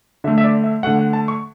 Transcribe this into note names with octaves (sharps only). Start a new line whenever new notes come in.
D3 A3 E5
E5
D5
E5
D3 A3 F#5
F#5
A5
C#6